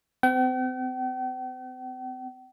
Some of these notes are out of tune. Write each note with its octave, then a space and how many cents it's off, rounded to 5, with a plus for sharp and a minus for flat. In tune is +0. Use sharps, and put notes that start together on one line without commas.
C4 -35 G5 -45